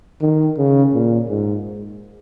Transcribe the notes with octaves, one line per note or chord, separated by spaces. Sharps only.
D#3
C#3
A#2
G#2